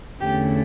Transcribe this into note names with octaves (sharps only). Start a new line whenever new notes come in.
E2 D3 A3 C#4 G4